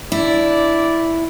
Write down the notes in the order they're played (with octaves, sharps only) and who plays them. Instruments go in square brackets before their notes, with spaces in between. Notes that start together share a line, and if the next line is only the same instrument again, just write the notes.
[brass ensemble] D4 D5 [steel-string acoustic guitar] E4